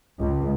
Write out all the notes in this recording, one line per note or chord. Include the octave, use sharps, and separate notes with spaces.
C#2